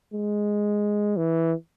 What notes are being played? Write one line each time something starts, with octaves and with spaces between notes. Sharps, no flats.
G#3
E3